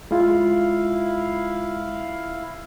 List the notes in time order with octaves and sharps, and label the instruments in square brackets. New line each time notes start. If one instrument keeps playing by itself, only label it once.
[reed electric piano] G#3 F4 [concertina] E4 F5